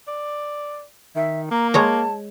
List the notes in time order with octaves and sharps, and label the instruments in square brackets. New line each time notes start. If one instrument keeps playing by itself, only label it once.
[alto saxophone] D5
[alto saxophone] D#3 [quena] E5
[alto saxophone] A#3 [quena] A#5
[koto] G#3 C#5 A#5 [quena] A5